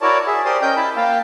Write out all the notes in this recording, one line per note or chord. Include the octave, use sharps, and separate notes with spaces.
E4 F#4 A#4 C#5 D5 A5
G#4 E5
G4 A#4 C5 D5 C6 D#6
C#4 A#4 D#5 G5 G6
E4 A5 B5
A#3 F5 G5 A5